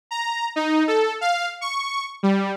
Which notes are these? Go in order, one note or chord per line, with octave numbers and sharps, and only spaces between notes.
A#5
D#4
A4
F5
C#6
G3